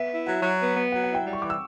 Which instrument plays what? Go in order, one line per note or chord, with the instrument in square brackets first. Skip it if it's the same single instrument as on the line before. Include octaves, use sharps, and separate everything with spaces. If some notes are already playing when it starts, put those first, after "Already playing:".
Already playing: [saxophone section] B3 [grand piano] E5
[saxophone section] E4
[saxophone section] F#3 [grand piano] F#5
[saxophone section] F#3
B3
B3
[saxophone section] F#3 [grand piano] F#5
[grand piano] F#5
[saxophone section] E4
[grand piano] G5
[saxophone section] G3
[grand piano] C#6
[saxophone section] E3 [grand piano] D6
[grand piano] E6